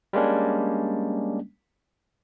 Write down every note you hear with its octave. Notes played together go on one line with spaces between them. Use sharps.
G3 G#3 A#3 C#4 D4